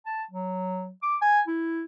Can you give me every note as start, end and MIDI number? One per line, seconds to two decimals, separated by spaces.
0.06 0.23 81
0.31 0.91 54
1.03 1.16 86
1.22 1.41 80
1.47 1.84 64